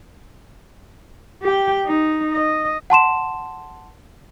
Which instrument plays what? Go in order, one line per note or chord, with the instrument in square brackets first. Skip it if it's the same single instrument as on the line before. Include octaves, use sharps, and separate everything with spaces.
[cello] G4 G5
D#4
D#5
[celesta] F#5 A5 C6 E7